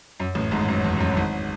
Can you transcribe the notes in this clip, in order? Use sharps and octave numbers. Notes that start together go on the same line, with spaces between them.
F#2
A1 A2
G#1 G#2
F#2
E2
F#2
F#2
G#1 G#2